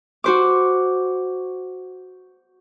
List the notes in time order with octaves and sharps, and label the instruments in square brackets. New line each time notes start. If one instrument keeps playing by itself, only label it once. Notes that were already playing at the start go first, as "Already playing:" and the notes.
[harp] F#4 C5 D6